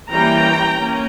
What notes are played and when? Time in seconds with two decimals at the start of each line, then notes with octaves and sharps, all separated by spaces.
0.11 E3 G3 A#3 C#4 G5 A#5
0.76 A#3 C#4